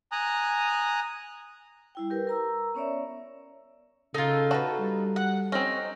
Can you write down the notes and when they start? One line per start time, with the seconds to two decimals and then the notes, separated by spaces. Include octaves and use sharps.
0.12 G#5 A#5 D#6 F#6
1.95 G3 E4 G5
2.10 G4 A#4 B4
2.27 A#4 A#5 E6
2.75 B3 C#4 C#5 D5 E5
4.14 C#3 D#4 F4 A4
4.51 F#4 A4 B4 A5 A#5
4.79 G3
5.16 F#5
5.52 C4 C#4 D#4